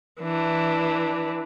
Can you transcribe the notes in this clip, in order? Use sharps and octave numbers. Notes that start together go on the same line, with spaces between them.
E3 D4